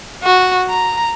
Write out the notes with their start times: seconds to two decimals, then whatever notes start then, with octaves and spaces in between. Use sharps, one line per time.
0.23 F#4
0.69 A#5